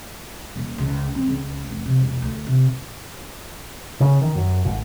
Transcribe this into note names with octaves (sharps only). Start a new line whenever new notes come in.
D#1
C#2
C4
C#2
F1
C3
E1
D2
C3
C#3
D#3
F#2
G#1